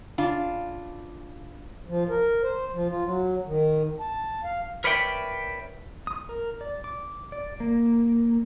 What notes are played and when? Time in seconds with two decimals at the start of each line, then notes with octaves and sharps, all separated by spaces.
0.18 C#3 D4 F4
1.88 F3
2.09 A#4
2.43 C5
2.73 F3
2.90 F4
3.04 F#3
3.46 D#3
4.01 A5
4.44 F5
4.84 A#4 B4 C#5 D5 E5 G5
6.07 D#6
6.29 A#4
6.61 D5
6.84 D6
7.32 D5
7.60 A#3